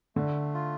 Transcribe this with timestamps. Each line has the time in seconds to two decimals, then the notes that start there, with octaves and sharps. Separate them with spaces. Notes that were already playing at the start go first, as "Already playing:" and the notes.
0.16 D3 A3
0.54 F4